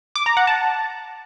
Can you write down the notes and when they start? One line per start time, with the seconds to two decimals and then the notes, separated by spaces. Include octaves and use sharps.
0.16 D6
0.26 A#5
0.37 F#5
0.47 A5